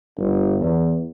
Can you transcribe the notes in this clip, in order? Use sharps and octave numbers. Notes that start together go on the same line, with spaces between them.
G1
E2